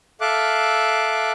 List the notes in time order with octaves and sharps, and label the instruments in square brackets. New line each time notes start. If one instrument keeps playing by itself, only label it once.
[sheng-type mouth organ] A4 E5 F5 D6 F#6